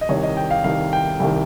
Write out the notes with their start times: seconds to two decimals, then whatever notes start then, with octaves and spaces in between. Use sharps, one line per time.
0.01 D#5
0.09 C2 C3 D#3 C#5
0.23 D#5
0.37 G5
0.51 F5
0.64 C2 C3 D#3 F5
0.93 G5
1.20 C2 C3 D#3